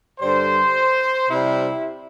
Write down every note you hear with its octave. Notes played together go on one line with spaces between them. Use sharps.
G2 D3 G3 C5
C3 G3 E4